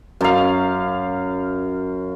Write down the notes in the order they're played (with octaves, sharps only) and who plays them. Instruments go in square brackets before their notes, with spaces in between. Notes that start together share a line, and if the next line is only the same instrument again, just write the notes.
[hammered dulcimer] F#2 F5